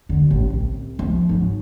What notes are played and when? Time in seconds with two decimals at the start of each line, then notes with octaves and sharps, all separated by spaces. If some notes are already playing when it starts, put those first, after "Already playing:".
0.09 F#2 D3
0.31 A1 D3
0.50 C2
0.99 F3
1.29 G#2 F#3